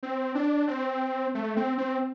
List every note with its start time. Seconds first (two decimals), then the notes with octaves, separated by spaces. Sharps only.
0.03 C4
0.35 D4
0.68 C4
1.35 A3
1.57 C4
1.78 C4